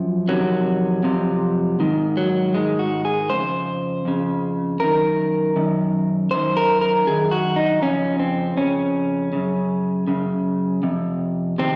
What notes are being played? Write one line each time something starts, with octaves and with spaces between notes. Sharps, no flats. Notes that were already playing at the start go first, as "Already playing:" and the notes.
Already playing: F#2 F3
F2 C3 D#3 F#3
F2 C3
G#2 D#3
F#3
G#2 D#3 G#3
F#4
G#4
F2 C#3 C5
F2 C#3
F#2 D#3 A#4
F#2 D#3
F#2 D#3 C5
A#4
A#4
F#2 D#3 G#4
F#4
D#4
F2 C#3 C#4
C4
F2 C#3 C#4
F#2 C#3
F#2 C#3
F2 C3
C3 D#3 C4